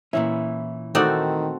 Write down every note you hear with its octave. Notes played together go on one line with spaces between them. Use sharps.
A#2 E3 C#4 E4
D#3 A3 C4 D#4 F#4 A4 D5